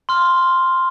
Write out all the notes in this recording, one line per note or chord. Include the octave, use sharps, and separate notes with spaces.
C6 F6